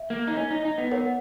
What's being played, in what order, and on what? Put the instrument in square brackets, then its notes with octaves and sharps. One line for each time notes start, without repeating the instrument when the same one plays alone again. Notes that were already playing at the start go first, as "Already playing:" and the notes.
Already playing: [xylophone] E5
[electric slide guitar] A#3
D#4
C#4
D#4
D#4
B3
[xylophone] A#4 C#5 F#5
[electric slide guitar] B3